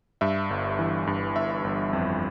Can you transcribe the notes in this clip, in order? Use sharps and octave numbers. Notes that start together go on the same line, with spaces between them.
G2 E5
G1
E3
G2
G1 E5
G1
F2